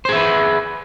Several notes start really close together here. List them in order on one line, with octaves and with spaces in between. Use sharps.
C5 G#4 E5 B4